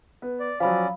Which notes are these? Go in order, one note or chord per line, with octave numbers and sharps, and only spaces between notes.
B3
D5
F3 F#3 C#4 D5 F5 B5